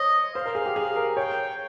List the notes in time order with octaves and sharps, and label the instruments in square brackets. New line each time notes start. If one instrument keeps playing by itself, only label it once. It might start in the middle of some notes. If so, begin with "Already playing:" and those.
Already playing: [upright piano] C5 C#5 [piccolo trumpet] D#5
[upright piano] C5 [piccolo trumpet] F5
[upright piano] A#4
G#4
G4
G#4
A#4
[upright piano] C#5 [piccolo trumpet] G5